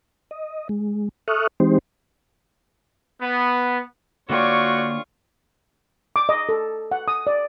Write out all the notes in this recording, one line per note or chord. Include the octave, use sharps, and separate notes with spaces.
D#5
G#3
A4 E5 C#6 D#6 F6 F#6
E3 G#3 C4 D#4 G4 C5
B3
D3 A#3 F4 F#4 C#5 D5 G5 C#6
D6
D#5
A4
F#5
D#6
D5